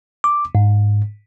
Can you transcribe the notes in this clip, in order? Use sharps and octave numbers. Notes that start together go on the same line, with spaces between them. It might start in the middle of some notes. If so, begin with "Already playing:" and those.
D6
G#2